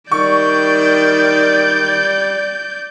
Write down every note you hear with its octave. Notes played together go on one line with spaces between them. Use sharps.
D#3 G3 D5 C#6 G6